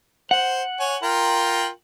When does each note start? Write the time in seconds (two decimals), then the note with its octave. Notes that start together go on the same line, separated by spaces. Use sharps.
0.31 C5 F#5
0.80 C#5 G#5
1.03 F4 A#4 G5